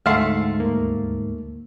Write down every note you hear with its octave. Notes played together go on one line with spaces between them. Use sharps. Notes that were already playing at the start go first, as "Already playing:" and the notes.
D2 G#2 A3 F5 F#5 C6
D#2 A#3